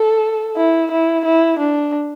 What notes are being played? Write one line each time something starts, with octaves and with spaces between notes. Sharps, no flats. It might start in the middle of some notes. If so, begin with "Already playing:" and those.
Already playing: A4
E4
E4
E4
D4